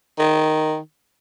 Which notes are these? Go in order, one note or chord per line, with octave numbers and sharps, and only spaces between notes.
D#3